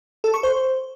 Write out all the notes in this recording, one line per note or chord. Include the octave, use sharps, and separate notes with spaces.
A4
C#6
C5